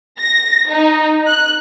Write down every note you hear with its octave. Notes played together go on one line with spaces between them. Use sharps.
A#6
D#4
F#6